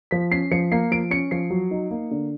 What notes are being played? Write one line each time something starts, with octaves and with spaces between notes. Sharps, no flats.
F3 B6
C#4 C7
F3 C#7
A#3 C7
F3 D7
C#4 C#7
F3 C7
F#3
D#4
A#3
D3